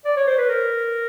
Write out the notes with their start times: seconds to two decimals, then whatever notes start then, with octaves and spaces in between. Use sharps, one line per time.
0.05 D5
0.16 C#5
0.27 C5
0.38 B4
0.49 A#4